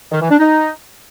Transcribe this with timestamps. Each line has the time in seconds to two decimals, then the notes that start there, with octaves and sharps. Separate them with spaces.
0.12 D#3
0.21 E3
0.30 D4
0.39 D#4